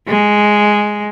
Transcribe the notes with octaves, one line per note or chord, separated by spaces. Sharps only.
G#3